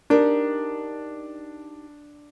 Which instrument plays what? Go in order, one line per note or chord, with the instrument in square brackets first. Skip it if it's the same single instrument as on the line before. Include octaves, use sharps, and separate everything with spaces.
[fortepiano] D4 [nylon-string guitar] D#4 G4 A#4